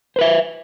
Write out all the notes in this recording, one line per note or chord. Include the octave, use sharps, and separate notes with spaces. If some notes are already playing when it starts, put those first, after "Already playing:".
B4 C5 E5